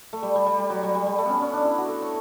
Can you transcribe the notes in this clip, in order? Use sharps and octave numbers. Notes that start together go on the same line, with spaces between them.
A3
G3
G3
G3
G3
F#3
G3
G3
G3
A3
B3 C#4
C#4
D4
E4
F#4
A4
C#5